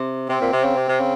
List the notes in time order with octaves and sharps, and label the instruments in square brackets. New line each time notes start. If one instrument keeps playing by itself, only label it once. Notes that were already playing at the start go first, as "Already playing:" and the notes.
Already playing: [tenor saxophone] C3
[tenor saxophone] C3 [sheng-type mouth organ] C4
[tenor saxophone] A#2
C3
C#3
C3
C3
C#3